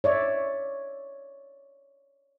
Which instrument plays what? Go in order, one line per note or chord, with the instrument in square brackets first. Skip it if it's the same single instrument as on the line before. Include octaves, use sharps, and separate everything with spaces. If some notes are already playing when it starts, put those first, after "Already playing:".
[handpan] C#5 D5 E5